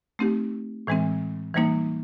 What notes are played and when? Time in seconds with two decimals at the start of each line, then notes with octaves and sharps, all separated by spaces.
0.19 A3 C4 D#4 G4
0.87 A2 E3 G#3 C4
1.54 E3 G3 A#3 D#4